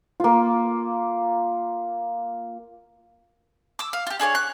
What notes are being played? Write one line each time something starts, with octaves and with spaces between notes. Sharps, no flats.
A#3 F4
D6 E6
F5
F4 G4
D4 G#4 B4 C#5
F#6